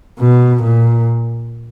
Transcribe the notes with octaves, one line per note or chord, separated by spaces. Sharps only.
B2
A#2